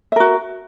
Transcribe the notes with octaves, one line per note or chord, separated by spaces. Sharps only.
F#4 A#4 E5